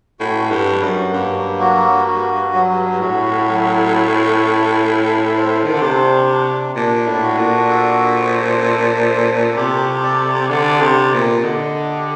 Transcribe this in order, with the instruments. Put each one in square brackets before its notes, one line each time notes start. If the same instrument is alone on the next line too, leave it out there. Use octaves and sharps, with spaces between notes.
[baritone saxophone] A2 [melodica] F#4
[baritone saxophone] G2
[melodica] F#3
[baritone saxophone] F#2
[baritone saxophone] G2 [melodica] A#3
[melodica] F#4
F#4
F#3
[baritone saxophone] A2 [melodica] F#4
[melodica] F#3
A3
A4
A4
C5
[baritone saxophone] D#3
D3
[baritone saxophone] C3 [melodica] D4
[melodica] D4
[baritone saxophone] A#2 [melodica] D4
[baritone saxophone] A2
[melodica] F#4
[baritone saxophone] A#2
[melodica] A4
C5
A4
A4
[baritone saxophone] C3 [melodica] G4
[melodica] D5
[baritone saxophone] D3 [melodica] D5
[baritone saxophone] C3
[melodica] D5
[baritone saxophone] A#2
[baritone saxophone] D3 [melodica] D#5
[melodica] G4